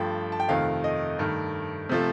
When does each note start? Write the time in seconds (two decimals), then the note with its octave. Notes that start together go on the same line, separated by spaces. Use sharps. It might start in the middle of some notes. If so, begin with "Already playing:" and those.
Already playing: G2 F3 A3 G5
0.32 A5
0.40 G5
0.49 F2 C3 D#3 A3 F5
0.84 D#5
1.19 G2 D#3 A3
1.89 C3 F3 A3